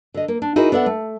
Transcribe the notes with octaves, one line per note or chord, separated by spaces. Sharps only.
D3 D#5
A#3
D4
D#4 E4 F#4 G#4 A#4 D#5
B3 D4 A4 E5 F#5
A3